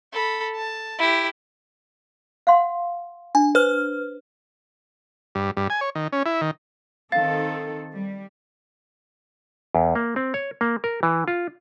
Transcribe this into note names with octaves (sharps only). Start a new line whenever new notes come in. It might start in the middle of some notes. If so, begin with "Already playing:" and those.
A4 B5
A5
E4 G4
F5 F#5 C6
D4 G#5
B4 C5 F6
G2
G2
G#5
C#5
D#3
C#4
E4
D#3
D#3 C4 A4 F5 A6
G3
E2
A#3
C4
C#5
A#3
A#4
E3
F4